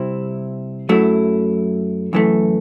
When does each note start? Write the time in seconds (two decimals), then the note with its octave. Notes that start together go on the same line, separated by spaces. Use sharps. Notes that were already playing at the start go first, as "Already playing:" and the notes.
Already playing: C3 G3 C4 E4
0.89 F#2 F#3 A3 E4
2.13 F#2 E3 A3